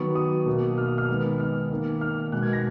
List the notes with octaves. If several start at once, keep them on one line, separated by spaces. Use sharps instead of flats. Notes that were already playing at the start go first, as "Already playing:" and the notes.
Already playing: D#3 F#3 B3 C#6
D#6
B2 A#3
F6
D#6
F6
D#3 G#3 B3
F6
D#3 A#3
F6
B2 G#3 B3 F#6
G#6
A#6